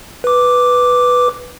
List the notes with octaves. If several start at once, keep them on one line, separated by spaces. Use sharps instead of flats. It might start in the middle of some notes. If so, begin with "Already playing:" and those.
B4 D6